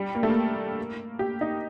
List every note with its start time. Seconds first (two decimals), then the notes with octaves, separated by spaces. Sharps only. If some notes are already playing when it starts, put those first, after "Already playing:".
Already playing: G3
0.15 A#3
0.23 A3
0.29 A#3
1.19 G4
1.41 D#4